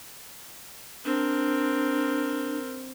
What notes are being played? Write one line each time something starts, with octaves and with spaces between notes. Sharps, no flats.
C4 D4 A#4